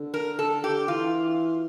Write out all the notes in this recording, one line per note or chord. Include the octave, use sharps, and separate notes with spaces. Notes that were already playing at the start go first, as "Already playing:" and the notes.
Already playing: D3
A#4
A4
G4
E3 F4